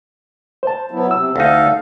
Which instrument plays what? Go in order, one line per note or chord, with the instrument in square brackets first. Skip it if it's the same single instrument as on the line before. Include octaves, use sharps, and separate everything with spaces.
[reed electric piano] C5 A5
[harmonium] F#3 B3 E4
[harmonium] C3 [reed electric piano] E6
[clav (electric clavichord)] D2 D#4 [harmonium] A4 F5